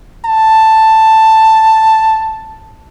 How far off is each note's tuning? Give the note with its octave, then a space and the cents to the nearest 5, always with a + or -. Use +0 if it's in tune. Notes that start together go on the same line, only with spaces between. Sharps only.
A5 +5